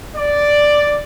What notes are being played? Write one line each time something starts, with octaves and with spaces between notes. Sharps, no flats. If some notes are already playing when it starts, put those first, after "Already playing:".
D5